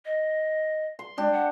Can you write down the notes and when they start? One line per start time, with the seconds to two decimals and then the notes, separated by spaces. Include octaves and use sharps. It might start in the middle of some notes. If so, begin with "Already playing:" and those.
0.05 D#5
0.99 C6
1.18 G#3 D4 G4
1.33 F#5